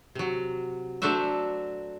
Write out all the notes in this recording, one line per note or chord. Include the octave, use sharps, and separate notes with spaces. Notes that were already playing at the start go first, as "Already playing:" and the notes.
C3 F#3
F#3 A3 D4 F#4 C5 E5